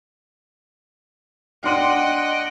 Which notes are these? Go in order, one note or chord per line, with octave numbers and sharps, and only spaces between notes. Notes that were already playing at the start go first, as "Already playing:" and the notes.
D4 D#5 F#5 G5 C6 D#7